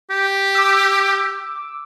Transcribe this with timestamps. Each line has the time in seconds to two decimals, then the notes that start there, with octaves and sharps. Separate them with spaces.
0.10 G4
0.55 D6 E6